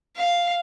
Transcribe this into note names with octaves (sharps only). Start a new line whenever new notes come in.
F5